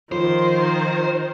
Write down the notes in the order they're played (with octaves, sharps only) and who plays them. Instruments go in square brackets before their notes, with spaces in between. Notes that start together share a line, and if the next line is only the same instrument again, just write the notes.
[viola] D#3 [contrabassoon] F3 [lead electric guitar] C5